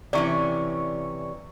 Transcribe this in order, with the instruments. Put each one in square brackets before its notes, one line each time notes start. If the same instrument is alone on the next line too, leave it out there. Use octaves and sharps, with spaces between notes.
[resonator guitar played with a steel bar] C3 E3 C#4 [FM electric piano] D5 C#6